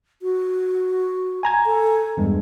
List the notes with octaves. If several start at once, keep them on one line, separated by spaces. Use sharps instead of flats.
F#4
G#5 A#5 G#6
A4
E2 G2 G#3